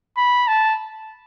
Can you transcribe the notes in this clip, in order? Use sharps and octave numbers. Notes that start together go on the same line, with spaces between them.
B5
A5